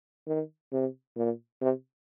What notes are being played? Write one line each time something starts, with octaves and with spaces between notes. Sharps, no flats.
D#3
C3
A#2
C3